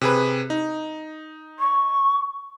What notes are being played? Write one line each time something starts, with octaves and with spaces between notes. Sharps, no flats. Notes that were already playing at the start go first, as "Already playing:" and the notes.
C3 G#4 B4
D#4
C#6